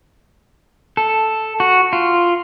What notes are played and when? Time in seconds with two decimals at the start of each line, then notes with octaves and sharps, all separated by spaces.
0.97 A4
1.60 F#4
1.93 F4